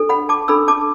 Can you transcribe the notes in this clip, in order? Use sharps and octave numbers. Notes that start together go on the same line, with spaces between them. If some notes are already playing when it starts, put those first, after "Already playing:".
Already playing: D4 A4
F#5 B5
A5 D6
D4 A4 B5 E6
A5 D6